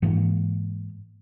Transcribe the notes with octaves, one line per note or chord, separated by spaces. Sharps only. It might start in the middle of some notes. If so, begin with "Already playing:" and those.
G#2 E3 G#3 A#3